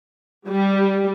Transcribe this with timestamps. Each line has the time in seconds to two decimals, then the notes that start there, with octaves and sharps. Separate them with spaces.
0.49 G3